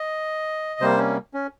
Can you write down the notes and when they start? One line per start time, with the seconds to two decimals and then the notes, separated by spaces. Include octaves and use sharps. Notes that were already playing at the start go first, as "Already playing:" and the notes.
Already playing: D#5
0.80 C3 G3 A#3 C5
0.98 C#4
1.34 C#4